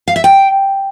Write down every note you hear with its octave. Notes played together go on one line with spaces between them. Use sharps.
F5
E5
G5